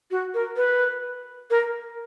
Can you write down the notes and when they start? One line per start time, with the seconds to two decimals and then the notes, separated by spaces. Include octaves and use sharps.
0.11 F#4
0.34 A#4
0.56 B4
1.50 A#4